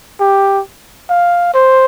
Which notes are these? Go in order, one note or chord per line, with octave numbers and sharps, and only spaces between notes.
G4
F5
C5